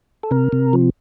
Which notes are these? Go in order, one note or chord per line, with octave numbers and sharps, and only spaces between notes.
A4
C3 A#4
C3
F3